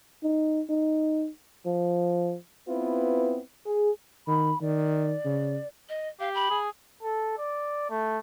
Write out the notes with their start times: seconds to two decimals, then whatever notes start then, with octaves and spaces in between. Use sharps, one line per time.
0.23 D#4
0.70 D#4
1.66 F3
2.68 B3 C4 E4 F4 B4
3.66 G#4
4.27 D#3 B5
4.61 D#3 D5
5.25 C#3
5.89 D#5
6.20 G4 F5
6.35 B5
6.50 G#4
7.03 A4
7.37 D5
7.90 A3